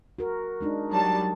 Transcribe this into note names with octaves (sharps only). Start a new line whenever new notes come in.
F#4 A#4
G#3 D4 D#4
F#3 G3 A5